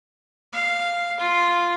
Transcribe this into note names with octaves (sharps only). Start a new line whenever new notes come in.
F5
F4